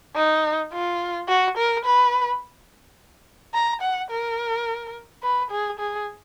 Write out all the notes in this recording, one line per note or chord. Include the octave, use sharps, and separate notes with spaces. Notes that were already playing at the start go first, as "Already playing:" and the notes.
D#4
F4
F#4
A#4
B4
A#5
F#5
A#4
B4
G#4
G#4